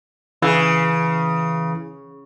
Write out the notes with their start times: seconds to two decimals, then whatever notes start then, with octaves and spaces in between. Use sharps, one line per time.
0.42 C#3 E3